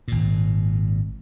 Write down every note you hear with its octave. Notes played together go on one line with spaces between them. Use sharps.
G#1 A#2